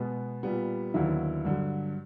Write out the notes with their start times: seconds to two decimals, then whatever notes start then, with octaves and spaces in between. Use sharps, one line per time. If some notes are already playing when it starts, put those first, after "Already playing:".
Already playing: B2 G#3 B3
0.43 A#2 G3 B3
0.94 D#2 D3 F#3 B3 E4
1.45 G2 D3 F#3